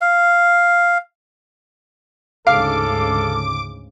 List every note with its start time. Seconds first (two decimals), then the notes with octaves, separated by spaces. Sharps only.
0.01 F5
2.47 D2 G#2 C#3 A4 F5 D6